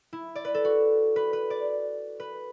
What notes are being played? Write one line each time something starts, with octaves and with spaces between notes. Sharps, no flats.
E4
D5
B4
A4
F#4
B4
B4
D5
B4